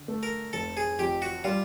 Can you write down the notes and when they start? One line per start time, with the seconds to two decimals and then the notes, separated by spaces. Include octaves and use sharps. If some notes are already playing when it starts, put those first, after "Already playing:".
Already playing: D3
0.08 A3
0.23 A#4
0.53 F1 A4
0.77 G#4
0.99 F2 G4
1.22 F#4
1.44 G3 F4